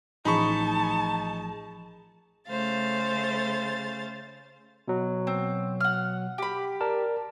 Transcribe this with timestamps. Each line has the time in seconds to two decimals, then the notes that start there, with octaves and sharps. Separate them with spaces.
0.25 A1 F3 D#4 G#4 A5 B5 C#6
2.48 C#3 A3 C5 F5 A6
4.88 B2 F#3
5.27 C4
5.80 F#5 F6
6.38 G4 B5
6.81 A#4 D5 A5